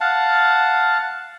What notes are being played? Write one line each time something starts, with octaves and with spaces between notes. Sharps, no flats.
F5 F#5 A5